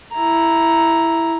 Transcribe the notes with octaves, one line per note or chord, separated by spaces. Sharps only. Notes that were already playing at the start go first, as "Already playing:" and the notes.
E4 A#5